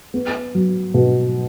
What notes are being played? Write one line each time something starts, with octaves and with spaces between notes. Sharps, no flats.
B3
F#3
B2